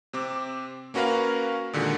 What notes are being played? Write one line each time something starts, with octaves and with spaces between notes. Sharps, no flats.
C3 C4 D6
A#3 C#4 F#4 A#4 B4 F5
A#2 D3 D#3 G#3 F#4